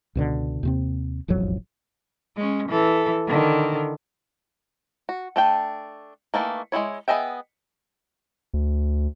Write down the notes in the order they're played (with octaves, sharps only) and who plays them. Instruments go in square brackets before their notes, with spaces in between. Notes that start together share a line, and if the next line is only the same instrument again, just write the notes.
[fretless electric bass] C#2 B2 D3
D#2 C3 C4
E1 A1 F2 F#3
[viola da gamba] G#3 C#4
E3 A4
D3 D#3
[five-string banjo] F#4
A3 D4 G5
D#3 E3 A3 A#3
G#3 C4 E4 C#5
B3 G#4 D#5 E5 G5
[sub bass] D2